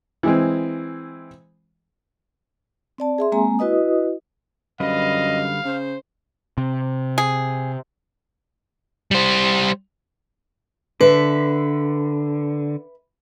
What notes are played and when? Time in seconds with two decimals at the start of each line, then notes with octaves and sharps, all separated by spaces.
0.23 E3 G#3 C4
2.98 C4 D5 A5
3.18 G#4 E5 C6
3.32 G#3 A#3 C4 G#5 A#5
3.59 E4 F#4 B4 D#5 D#6
4.80 F#2 D3 G3 B4 D#5 F5
5.65 C#3 C5
6.58 C3
7.18 G#4
9.11 G3 C5
11.01 D3 B4 E5